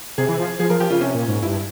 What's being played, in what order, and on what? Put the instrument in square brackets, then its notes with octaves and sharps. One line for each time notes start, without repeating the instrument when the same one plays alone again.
[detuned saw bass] C3 [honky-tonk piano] G#4
[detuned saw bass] E3
F3
[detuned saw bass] F3 [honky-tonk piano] G#4
[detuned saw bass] F3 [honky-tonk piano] A#4
[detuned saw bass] F3 [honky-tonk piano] G4
[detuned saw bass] C#3 [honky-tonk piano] F4
[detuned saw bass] C3 [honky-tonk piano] C#4
[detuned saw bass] A#2
G#2
[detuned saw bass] G2 [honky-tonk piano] E4